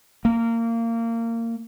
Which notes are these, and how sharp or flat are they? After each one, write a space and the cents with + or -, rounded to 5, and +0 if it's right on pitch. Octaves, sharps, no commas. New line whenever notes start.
A#3 -20